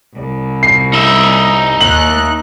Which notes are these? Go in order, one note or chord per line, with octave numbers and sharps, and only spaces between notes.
C2
C7
D#4 E5
D#2 F#6 F#7